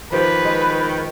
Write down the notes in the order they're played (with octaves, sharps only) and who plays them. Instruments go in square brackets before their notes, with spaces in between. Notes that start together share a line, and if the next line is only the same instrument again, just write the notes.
[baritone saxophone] D#3 [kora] F3 G4 [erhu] B4
[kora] G#3